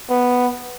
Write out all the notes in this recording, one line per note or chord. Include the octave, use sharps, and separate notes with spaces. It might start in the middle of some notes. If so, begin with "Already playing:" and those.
B3